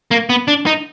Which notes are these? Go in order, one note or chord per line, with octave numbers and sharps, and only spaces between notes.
A#3
B3
D4
D#4